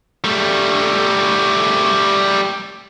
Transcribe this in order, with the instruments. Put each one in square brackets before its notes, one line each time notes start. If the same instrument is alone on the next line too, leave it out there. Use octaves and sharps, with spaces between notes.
[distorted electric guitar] G3 A3